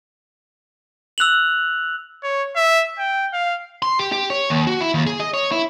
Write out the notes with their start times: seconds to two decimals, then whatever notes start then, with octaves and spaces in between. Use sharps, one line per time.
1.18 E6 F#6 F7 F#7
2.23 C#5
2.56 E5
2.99 G5
3.33 F5
3.82 C6
3.99 G4
4.12 G4
4.30 C#5
4.50 D#2
4.67 F#4
4.81 E4
4.94 D#2
5.07 G#4
5.20 D#5
5.34 C#5
5.52 E4